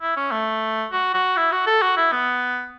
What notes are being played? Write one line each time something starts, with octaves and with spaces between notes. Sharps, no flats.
E4
C#4
A3
F#4
F#4
E4
F#4
A4
F#4
E4
B3